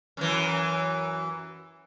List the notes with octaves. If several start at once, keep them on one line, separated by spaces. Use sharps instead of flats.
F#2 D3 E3